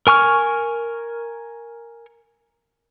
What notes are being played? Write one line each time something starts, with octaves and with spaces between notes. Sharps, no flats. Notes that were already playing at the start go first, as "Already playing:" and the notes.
A#4 G#5 C#6 F6